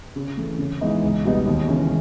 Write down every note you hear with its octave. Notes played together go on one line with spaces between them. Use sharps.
C#3
E3 A3
C#3
E3 G#3 B3 D#4
C#2
B2 G3 B3 D#4
D#2
C#3 E3 G#3 C#4